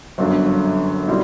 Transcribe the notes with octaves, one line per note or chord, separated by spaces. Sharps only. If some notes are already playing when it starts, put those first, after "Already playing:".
G1 F#2 D3
B2 G3 C4 E4